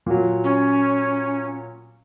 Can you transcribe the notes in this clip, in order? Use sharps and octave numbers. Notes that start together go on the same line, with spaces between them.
A#2 F#3
C#4